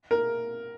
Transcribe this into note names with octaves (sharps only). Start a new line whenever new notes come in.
A#4